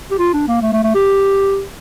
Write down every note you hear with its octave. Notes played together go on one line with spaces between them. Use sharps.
G4
F4
D4
A#3
A3
A3
A3
G4